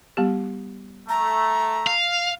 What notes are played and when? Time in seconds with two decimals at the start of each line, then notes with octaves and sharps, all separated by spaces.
0.17 G3 B3 G4
1.09 A3 A#5
1.87 F5